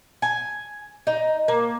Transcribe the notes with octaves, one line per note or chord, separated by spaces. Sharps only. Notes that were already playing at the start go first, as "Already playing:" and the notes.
G#5
D#4
A#3